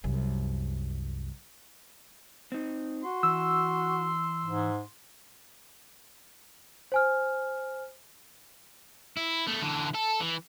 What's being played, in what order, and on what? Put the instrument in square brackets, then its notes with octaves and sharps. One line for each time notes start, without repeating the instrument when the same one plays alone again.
[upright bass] C2 F#2
[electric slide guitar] C4 D#4
[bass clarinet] F#4 [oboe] C6
[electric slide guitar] E3 [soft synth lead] E6
[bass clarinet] G#2
[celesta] C5 G#5 F6
[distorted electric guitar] E4
A3 B3
D3 E3
A4
E3